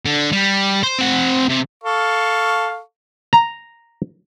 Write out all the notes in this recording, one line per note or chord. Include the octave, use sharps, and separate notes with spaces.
D3
G3
C5
C4 F#5
C3
A4 F5 C#6
A#5